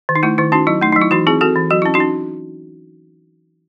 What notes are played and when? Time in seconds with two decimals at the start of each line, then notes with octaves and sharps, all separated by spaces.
0.09 D#3
0.15 D#4
0.23 A3 E4
0.38 D#3 E4
0.52 C#4 D#4 F#4
0.67 F#3 E4
0.81 A3 D#4
0.92 D#4
0.96 F#3
1.02 E4
1.11 E3 D#4 F#4
1.27 C4 E4 G#4
1.41 C4 F#4 A4
1.56 E3
1.71 F#3 F#4
1.82 C#4 E4
1.94 D#4 F#4
2.00 C#4